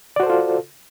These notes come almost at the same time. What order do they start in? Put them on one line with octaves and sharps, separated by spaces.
D5 F#4 C5 A4 F4